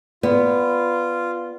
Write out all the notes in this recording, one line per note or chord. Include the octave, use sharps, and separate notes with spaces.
B3 F4 D5